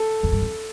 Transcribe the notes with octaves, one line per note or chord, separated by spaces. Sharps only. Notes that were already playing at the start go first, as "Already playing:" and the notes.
Already playing: A4
F2
G2
F2